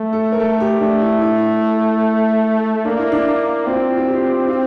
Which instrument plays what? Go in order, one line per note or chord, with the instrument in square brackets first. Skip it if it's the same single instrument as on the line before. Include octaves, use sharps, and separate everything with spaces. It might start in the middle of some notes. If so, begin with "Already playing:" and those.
Already playing: [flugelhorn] A3
[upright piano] A4
A#4
[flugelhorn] A3 [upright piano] A4
[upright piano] G4
[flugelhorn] A3 [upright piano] D4
[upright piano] E4
E4
[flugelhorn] A#3 [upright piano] D4
[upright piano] E4
D4
[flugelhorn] C4 [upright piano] F4
[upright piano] F4
G4
F4